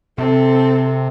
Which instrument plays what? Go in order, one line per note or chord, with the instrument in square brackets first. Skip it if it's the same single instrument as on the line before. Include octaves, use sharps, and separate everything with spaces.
[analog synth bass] C3 [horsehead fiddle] C4 A4